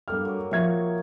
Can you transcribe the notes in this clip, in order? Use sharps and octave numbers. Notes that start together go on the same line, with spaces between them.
G2 G3 A#3 A4 F6
F#3 A#4
A#2 F3 D#4 E5 C#6 G#6